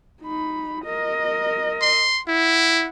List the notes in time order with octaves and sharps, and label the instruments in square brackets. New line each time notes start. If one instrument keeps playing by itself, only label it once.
[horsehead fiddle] D#4 B5
A#4 D#5
[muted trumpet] C6
[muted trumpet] E4 [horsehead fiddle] F#5